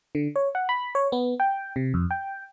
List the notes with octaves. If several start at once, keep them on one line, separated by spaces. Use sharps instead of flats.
D3
C#5
F#5
B5
C#5
B3
G5
C3
F2
G5